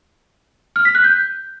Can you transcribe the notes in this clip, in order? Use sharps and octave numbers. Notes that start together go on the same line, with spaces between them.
F6
B6
F#6
G6